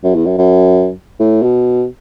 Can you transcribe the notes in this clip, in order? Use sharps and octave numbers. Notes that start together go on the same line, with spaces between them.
F#2
E2
F#2
F#2
A2
B2